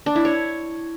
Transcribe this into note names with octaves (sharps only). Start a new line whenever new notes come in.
D4
E4
C#5